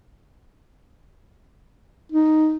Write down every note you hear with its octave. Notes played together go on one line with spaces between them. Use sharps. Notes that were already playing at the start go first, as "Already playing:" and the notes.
D#4